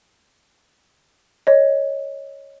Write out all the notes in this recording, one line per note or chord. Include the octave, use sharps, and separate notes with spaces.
C#5 D#5